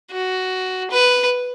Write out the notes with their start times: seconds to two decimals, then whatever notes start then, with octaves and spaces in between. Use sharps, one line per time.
0.11 F#4
0.90 B4